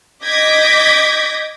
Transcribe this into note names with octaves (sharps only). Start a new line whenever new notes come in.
D#5 D6 G6 G#6 A#6 B6